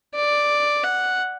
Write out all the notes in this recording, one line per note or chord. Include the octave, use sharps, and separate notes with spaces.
D5
F#5